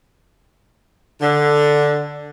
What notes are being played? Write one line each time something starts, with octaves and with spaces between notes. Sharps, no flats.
D3